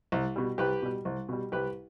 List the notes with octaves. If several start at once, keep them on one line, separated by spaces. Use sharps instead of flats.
C2
B2 G3
C2 G4 B4
B2 G3
C2
B2 G3
C2 G4 B4